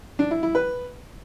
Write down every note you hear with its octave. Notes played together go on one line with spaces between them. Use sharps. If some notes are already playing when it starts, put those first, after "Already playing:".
D4
E4
E4
B4